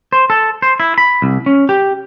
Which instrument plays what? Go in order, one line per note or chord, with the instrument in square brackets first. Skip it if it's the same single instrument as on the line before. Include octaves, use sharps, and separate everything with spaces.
[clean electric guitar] C5
A4
C5
E4
B5
C2
C#4
G4